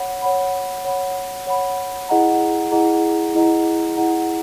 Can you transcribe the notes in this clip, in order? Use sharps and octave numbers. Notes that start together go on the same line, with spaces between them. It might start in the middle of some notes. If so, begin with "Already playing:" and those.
Already playing: C#5 F#5 B5
C#5 F#5 B5
C#5 F#5 B5
C#5 F#5 B5
E4 G#4 D#5 F#5 A#5
E4 G#4 D#5 F#5 A#5
E4 G#4 D#5 F#5 A#5
E4 G#4 D#5 F#5 A#5